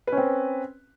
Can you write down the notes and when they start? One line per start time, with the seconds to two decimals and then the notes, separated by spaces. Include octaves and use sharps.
0.07 B4
0.12 C#4
0.17 C4